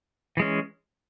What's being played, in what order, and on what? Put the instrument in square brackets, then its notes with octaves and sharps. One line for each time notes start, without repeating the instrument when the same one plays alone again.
[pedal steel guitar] E3 G#3 C#4